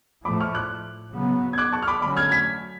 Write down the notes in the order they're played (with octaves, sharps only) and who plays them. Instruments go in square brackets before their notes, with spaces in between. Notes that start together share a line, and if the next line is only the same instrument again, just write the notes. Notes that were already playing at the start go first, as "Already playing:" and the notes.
[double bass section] A2 F3 A3 [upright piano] B5 D6
[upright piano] C#6 F6
D6 F#6
[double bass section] C#3 F#3 B3
[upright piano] G#6
D6 F#6
A5 C#6
F6
B5 D6
[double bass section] D3 F#3 A3 C#4 [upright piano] B5 D6
[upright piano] F6 G#6
G#6 B6